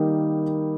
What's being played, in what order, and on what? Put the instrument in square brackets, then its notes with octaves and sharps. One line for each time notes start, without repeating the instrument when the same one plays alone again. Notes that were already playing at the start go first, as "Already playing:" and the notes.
Already playing: [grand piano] D#3 G3 A#3 D#4